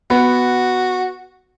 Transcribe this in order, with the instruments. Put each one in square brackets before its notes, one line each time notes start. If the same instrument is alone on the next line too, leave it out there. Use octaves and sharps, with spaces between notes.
[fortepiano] B3 [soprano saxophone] F#4